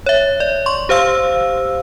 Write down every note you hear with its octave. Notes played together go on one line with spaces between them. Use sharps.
C#5 E5
D5
C6 C#6
G4 C5 F5 E6